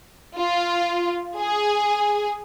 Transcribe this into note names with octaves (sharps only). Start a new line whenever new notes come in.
F4
G#4